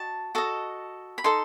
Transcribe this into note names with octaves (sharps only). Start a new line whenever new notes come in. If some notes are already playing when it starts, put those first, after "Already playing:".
Already playing: F#4 D#5 A5
F#4 A4 D#5
B5
D#4 A4 D#5 C6